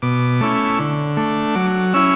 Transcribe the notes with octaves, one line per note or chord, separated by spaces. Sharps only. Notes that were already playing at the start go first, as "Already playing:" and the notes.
B2 D6
A3 C#4 E4
D3
A3 D4
F#3 D6
C#4 E4 E6